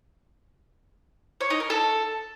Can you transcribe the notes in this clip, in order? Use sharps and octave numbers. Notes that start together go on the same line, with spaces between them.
C#5
D#4
A#4
A4